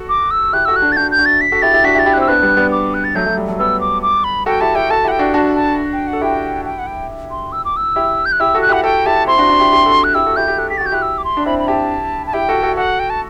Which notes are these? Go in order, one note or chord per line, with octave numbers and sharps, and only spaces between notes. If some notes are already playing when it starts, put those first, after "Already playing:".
Already playing: F#4 A4
D6
E6
E4 G4 F#6
F#4 A4 E6
F#6
D4 F#4
A6
D4 F#4 G6
G6
D4 F#4
A6
B6
F#4 A4
E4 G4 A6
E4 G4
D4 F#4 B6
E4 G4
A6
E4 G4
F#6
C4 E4 E6
B3 D4 F#6
G3 B3
G3 B3
D6
F#6
A6
F#3 A3 G6
F#3 A3
G3
F#3 A3
G3 B3 E6
D6
D6
B5
F#4 A4 G5
E4 G4 A5
E4 G4 G5
F#4 A4 A5
E4 G4 F#5
G5
D4 F#4
D4 F#4 A5
A5
G5
F#5
A4
E4 G4 G5
G5
F#5
G5
C6
E6
D6
E6
E4 G4
G6
F#6
E4 G4 E6
F#4 A4
F#6
E4 G4 F#5
F#4 A4 G5
E4 G4 A5
C4 E4 C6
D4 F#4
D4 F#4
E4 G4
E4 G4
F#4 A4
F#6
E4 G4 E6
F#4 A4
E4 G4 G6
E4 G4
A4 F#6
G4 B6
F#4 A6
G6
E4 G4 F#6
E6
D6
C6
D4
C4 E4 B5
B5
E4 G4 A5
A5
E4 G4 G5
F#4 A4
F#4 A4
F#4 A4 F#5
G5
A5